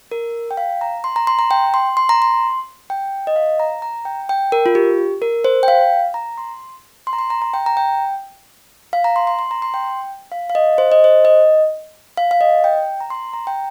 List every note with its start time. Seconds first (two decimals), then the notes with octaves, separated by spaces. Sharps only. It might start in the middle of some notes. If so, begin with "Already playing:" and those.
0.12 A#4
0.51 G5
0.57 F5
0.81 A#5
1.04 C6
1.16 A#5
1.27 C6
1.39 A#5
1.51 G5
1.74 C6
1.97 C6
2.09 A#5
2.22 C6
2.90 G5
3.27 D#5
3.36 F5
3.60 A#5
3.82 A#5
4.05 G5
4.29 G5
4.52 A#4
4.66 F4
4.75 G4
5.22 A#4
5.45 C5
5.63 G5
5.68 F5
6.14 A#5
6.38 C6
7.07 C6
7.13 A#5
7.19 C6
7.30 A#5
7.42 A#5
7.54 G5
7.66 A#5
7.77 G5
8.93 F5
9.04 A#5
9.16 C6
9.27 C6
9.39 C6
9.51 A#5
9.62 C6
9.74 G5
10.32 F5
10.50 F5
10.55 D#5
10.78 C5
10.92 D#5
11.04 C5
11.25 D#5
12.17 F5
12.31 F5
12.41 D#5
12.64 G5
13.01 A#5
13.10 C6
13.34 A#5
13.47 G5